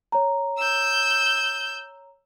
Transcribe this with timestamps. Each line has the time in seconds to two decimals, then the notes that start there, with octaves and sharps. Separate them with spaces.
0.12 C#5 A#5
0.58 E6 G6